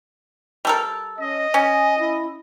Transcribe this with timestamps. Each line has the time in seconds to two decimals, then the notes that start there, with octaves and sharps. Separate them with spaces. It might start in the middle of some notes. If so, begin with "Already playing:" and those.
0.65 G3 A4 A#4
1.18 C#4 D#5
1.54 C#4 G#5
1.98 E4